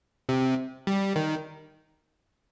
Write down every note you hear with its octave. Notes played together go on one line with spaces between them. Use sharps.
C3
G3
D#3